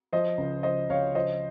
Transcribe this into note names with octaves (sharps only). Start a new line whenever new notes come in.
F3 C5 D#5
C#2
F3 C5 D#5
C#2 C#5 F5
F3 C5 D#5